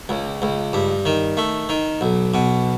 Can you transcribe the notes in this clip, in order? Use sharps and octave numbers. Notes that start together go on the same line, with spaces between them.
C#2
C#2
G2
D#3
A3
D#3
B1
B2